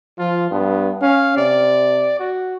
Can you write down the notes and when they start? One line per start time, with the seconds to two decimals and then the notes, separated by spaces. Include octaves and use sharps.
0.19 F3 F4
0.51 G2 B3
1.02 C#4 F5
1.37 C3 D5
2.19 F#4